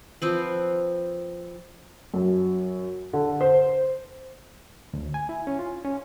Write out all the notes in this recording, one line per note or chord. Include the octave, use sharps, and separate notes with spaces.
F3 C4 B4
F#2
D3
C5
D2
G#5
E4
C#4
F4
C#4